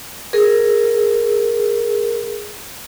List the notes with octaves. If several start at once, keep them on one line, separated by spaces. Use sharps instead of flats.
G#4 A#4